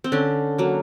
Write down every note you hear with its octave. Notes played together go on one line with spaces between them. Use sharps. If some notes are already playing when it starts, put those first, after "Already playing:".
C4
D3 C#4
F#3 A#3